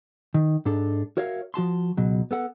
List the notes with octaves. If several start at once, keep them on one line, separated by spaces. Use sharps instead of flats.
D#3
G#2 D4 A4
F#4 A#4 C#5 E5 F5
F3 F#4 A5 C6
C#2 B2 F#3
B3 A4 F#5